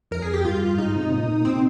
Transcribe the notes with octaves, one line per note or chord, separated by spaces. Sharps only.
F2 A#4
G#4
G4
G2 F4
G#2 D#4
C3
A#2
C3 C4